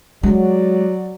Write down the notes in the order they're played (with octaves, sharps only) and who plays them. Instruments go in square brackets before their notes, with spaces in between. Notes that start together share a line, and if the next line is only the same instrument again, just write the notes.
[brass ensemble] F#3 D5 [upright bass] G#3